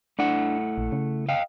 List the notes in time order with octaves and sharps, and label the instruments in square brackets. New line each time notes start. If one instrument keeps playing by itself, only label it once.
[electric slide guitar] A3 E4 F#5 [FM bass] D4
[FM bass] A#1
C#3
[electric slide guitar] D#5 F5 G5